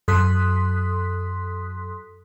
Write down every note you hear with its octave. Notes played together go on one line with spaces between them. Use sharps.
F#2 A4 C6 D#6 F#6 B6